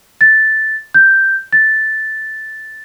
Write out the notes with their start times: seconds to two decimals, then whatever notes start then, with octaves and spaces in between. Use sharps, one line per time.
0.21 A6
0.94 G6
1.52 A6